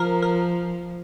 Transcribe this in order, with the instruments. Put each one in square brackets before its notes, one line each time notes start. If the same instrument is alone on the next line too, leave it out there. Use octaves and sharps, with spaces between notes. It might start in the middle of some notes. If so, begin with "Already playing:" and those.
Already playing: [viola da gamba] F3 [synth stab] A#4
[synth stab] A#4